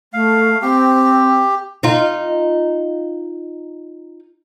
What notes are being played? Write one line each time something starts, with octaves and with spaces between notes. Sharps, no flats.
A3 F5
C4 G4
D#4 F4